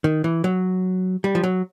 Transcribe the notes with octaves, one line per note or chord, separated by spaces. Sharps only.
D#3
E3
F#3
G3
F3
F#3